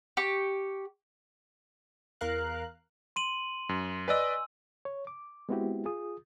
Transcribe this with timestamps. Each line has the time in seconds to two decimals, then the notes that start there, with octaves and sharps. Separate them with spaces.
0.17 G4 C#6
2.21 E2 A#4 F5 F#6
3.16 C6 D#7 F#7
3.69 F#2
4.08 B4 D5 D#5 G#5 E6
4.85 C#5
5.07 D6
5.49 G#3 B3 C4 E4 F#4 G4
5.85 F4 G#4 D#6